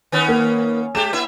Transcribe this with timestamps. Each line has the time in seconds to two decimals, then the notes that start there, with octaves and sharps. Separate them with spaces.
0.12 D#3 B3 C#4
0.28 A#3
0.95 G#3 G4 E7
1.13 A#3 E4 E5